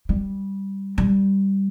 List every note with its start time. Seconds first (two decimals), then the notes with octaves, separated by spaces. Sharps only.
0.09 G3
0.98 G3